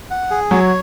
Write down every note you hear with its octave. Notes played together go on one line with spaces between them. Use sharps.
F#5
G#4
F#3 C#5